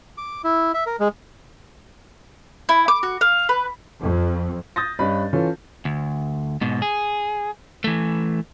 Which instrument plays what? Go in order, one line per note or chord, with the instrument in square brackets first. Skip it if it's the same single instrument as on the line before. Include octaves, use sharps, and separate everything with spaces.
[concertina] D6
E4
E5
A#4
G#3
[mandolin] E4
D6
F#4
F5
B4
[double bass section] F2
[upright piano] D#6 G6 A6 A#6
G2 C#4 D#5 B5
E3 C#4 F4 A4
[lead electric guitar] D2
G#2 B2
G#4
E3 A3